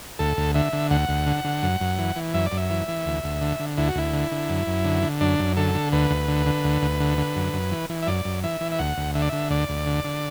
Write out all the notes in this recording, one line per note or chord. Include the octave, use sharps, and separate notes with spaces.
D2 A4
D2
D3 E5
D3
D2 F#5
D2
D3
D3
F#2
F#2
E3
E3
F#2 E5
D5
F#2
E5
E3
E3
D2
D2
D3
D3
D2 E4
F#4
D2 E4
D3
D3
F#2
F#2
D3
D3
F#2 D4
F#2
D3 A4
D3
D2 B4
D2
D3
D3
D2
D2
D3
D3
F#2
F#2
E3
E3
E5
F#2 D5
F#2
E3 E5
E3
E5
D2 F#5
D2
D3 E5
D5
D3 E5
D2 D5
D2
D3
D3